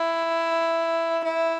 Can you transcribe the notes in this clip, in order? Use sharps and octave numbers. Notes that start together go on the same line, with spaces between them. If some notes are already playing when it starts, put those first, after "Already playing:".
Already playing: E4
E4